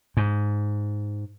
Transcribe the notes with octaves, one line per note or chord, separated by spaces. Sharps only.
G#2